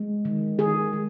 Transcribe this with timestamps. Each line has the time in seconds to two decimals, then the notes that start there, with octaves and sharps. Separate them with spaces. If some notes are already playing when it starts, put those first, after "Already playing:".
Already playing: G#3
0.25 D#3
0.59 D#3 G#4
0.93 G#3